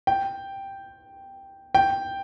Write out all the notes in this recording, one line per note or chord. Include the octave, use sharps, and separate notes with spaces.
G5
G5